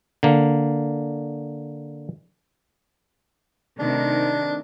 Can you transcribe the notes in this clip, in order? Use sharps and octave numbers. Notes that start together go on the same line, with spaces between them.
D3 A#3
C3 D#3 A3 D4